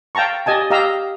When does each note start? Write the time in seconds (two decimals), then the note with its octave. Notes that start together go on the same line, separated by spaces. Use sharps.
0.15 F5 G5 A5 A#5 C#6
0.46 G4 D#5 G#5 A5
0.70 G4 D#5 F5 A#5 E6